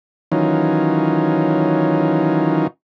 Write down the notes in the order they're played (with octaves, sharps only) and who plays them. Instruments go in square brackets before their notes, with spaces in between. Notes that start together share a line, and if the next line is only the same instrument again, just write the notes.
[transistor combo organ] D#3 E3 F#3 C#4 D#4 F4